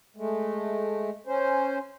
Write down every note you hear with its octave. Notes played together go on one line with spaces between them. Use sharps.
G#3 A3
C#4 C5